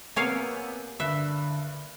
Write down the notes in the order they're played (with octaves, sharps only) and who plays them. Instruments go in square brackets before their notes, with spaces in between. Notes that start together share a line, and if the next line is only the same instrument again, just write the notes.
[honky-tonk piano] C3 B3 G#5 [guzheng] A#3 C#5 F5
[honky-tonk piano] G2 F#6 [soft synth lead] D3 [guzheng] E5